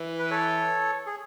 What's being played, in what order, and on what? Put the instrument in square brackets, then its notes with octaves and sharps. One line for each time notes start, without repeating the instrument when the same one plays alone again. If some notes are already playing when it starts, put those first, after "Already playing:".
Already playing: [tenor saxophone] E3
[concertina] B4
A4 C#5
G#4